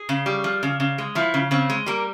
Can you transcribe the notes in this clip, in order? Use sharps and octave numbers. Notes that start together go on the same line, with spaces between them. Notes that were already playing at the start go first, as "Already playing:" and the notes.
Already playing: G#4
C#3
G3
F3
C#3
C#3
G#3
F3 E4
C#3
C#3 C4
G#3
G3 A#3